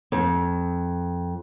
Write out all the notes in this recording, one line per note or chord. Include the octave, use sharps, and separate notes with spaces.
F2